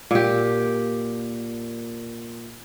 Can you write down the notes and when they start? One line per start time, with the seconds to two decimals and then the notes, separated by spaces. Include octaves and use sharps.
0.11 A#2 G4